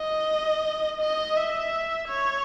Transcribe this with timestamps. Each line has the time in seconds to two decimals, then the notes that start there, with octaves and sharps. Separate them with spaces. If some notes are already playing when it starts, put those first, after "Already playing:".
Already playing: D#5
1.00 D#5
1.36 E5
2.08 C#5